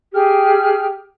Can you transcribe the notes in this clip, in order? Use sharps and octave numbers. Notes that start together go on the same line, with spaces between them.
G4 G#4 F6